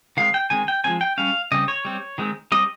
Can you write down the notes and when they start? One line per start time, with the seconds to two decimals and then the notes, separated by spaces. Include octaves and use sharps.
0.17 D#3 G#3 C4 F5
0.34 G5
0.50 D#3 G#3 C4 G#5
0.68 G5
0.84 F3 G#3 C4 G#5
1.01 G5
1.18 G3 C#4 F5
1.52 C#3 G3 C4 D#5
1.68 C#5
1.85 G3 C4
2.18 D#3 G#3 C4
2.52 G3 C4 D#5